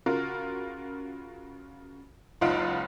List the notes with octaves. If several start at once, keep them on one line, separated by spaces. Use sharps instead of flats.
C#3 F4 F#4 A#4
F#1 C#2 D#4 F4 F#5 D7